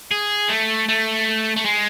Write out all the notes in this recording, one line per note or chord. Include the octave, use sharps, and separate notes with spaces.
G#4
A3
A3
A3
G#3